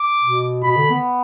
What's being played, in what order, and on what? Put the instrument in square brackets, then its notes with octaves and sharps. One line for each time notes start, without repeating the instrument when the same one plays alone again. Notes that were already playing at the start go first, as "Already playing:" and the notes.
Already playing: [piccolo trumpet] D6
[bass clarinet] B2
[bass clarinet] B2 [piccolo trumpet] B5
[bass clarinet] D3
B3